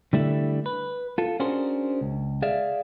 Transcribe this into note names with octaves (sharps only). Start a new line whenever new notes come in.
D3 G3 A3 E4
B4
F4 A4
C#4 D4 F#4 G#4 A#4 C5
C#2
G#4 D5 E5 F5